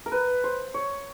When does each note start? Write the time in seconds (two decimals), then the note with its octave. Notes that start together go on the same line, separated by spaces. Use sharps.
0.06 A#4
0.12 B4
0.44 C5
0.74 C#5